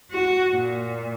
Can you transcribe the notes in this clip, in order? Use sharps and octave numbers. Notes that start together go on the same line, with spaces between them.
F#4
A#2